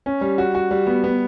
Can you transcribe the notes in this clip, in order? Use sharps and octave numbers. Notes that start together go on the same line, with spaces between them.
C#4
G3
F#4
F#4
G3
B3
B3